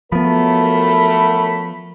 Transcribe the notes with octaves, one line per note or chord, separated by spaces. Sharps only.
F3 F#3 A3 B3 A#4 B5